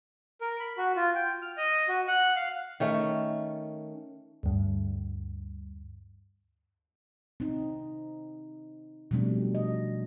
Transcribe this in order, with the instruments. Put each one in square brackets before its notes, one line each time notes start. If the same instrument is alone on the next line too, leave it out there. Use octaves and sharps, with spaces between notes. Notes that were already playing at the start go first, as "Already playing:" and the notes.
[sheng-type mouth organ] A#4
B5
F#4
F4
G5
F6
D#5
F#4
F#5
F5
[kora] D#3 A3 C#4
[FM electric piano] D2 G2
[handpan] C4 D#4
B2 F3 G3 A3 C4 D4
D#5